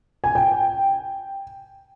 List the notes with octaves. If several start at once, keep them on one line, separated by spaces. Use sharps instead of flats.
G#5
G5